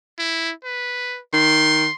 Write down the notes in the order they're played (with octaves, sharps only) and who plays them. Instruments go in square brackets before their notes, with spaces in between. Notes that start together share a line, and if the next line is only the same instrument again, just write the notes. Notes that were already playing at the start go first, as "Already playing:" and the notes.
[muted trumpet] E4
B4
[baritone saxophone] D#3 [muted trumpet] C6